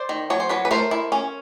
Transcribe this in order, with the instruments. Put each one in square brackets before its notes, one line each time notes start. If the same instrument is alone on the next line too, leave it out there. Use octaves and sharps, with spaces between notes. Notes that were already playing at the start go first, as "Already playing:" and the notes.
Already playing: [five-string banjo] C5 D5
D#3
F#3 C#5
C5
F#3 B4 C#5
B4
A3 A#4 C5
E4
C#4